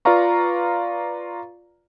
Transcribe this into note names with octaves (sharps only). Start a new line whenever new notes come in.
F4 B4 D5 F5 A#5 C#6